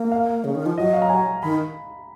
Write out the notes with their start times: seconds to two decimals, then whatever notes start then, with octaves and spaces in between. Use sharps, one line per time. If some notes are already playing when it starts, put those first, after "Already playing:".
Already playing: A#3
0.12 F5
0.44 C#3
0.55 D#3
0.66 F3
0.78 F#3 D#5
0.93 F5
1.02 A#5
1.09 G#5
1.43 D#3 B5